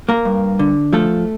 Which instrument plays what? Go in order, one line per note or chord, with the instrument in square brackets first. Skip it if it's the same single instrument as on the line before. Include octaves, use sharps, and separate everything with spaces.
[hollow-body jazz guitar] A#3 A#4
G2
D3
F3 A3 A4